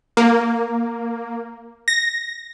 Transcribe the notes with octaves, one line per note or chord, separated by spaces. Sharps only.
A#3
A#6